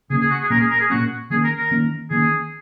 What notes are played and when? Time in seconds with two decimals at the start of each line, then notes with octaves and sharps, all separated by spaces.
0.10 C#3 A#3 C#4 G#4
0.21 G#4
0.30 F#4
0.40 G#4
0.50 A#2 A#3 C#4 A#4
0.60 G#4
0.70 A#4
0.80 G#4
0.90 A#2 A#3 C#4 F#4
1.30 D#3 A#3 C#4 G#4
1.44 A#4
1.57 A#4
1.71 D#3 A#3 C#4
2.10 D#3 A#3 C#4 G#4